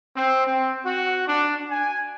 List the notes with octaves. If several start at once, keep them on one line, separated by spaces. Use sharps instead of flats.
C4
C4
F#4
D4
G#5